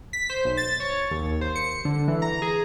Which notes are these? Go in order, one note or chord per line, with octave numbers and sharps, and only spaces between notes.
B6
C5
B1
A6
C#5
D#2
C5
C#7
D3
E3
A#5
G#4